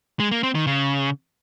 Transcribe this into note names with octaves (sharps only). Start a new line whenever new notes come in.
G#3
A#3
C4
D#3
C#3